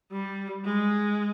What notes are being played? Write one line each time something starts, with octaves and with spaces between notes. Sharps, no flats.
G3
G#3